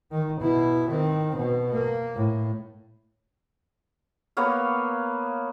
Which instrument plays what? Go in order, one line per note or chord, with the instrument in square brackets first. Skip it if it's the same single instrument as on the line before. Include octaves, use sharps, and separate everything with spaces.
[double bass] D#3
B2 E4
D#3 C4
B2
A#3
A2
[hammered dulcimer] A#3 B3 C#5 F5